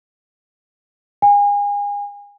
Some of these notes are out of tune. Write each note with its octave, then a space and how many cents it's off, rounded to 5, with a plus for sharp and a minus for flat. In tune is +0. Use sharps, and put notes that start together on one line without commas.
G#5 -35